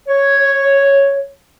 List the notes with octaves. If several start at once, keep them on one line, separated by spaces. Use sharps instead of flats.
C#5